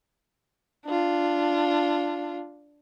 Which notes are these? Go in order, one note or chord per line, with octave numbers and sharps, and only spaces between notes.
D4 F4